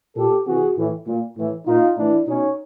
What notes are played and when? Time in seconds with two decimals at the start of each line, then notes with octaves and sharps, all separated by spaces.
0.17 A#2 G4 A4
0.47 C3 E3 F#4 G#4
0.77 A2 E3
1.07 A#2
1.38 A2 E3
1.67 A#2 D#4 F4
1.97 A2 E3 D4 E4
2.27 B2 C#4 D#4